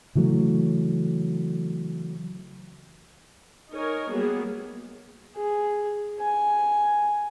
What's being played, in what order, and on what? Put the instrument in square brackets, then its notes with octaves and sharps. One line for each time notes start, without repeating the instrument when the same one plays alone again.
[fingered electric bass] C#3 E3 F#3 A3
[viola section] D#4 A#4 C#5 G#5
F#3 G3 A#3 B3 G#4
[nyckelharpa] G#4
G#5